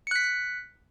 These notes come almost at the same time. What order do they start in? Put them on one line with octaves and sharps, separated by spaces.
C#7 F#6 B6